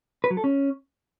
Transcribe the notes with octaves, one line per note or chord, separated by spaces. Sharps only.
B4
F#3
A4
C#4